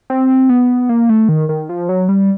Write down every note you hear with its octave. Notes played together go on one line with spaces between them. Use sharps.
C4
B3
A#3
A3
D#3
D#3
F3
F#3
G3